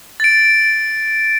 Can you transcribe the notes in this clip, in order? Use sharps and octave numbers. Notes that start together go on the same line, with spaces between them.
A6 D7